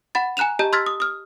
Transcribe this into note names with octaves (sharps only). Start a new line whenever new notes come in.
F#5 B5 A6
G#5 A#5 F#6 E7 F7
G4 D#5 A5 A#5 G6
C6 E6 F6 G#6 A6 B6
D#6
D#6 F6